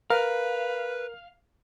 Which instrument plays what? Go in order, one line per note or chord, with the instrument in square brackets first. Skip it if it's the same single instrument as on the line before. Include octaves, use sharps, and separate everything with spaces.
[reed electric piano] A#4 [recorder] B4 [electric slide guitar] F5